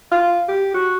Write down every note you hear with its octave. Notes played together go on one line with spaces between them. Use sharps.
F4
G4
F#4